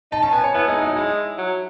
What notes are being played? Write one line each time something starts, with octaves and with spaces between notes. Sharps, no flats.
D#4 A5
C#4 A5
B3 G#5
C#5
B3 E4
G#3 D#4
F#3 D#4
G#3 E4
F#3